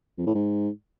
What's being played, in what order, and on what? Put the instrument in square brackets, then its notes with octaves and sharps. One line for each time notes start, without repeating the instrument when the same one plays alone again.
[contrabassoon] F2
A2
G#2